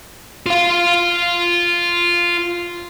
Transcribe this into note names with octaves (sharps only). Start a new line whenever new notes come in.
F4 F5